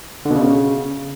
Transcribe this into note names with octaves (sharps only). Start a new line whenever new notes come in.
D3
B2
C#3